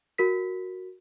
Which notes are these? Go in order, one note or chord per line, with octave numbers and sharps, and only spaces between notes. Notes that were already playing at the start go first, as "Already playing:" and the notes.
F#4 A#4 B6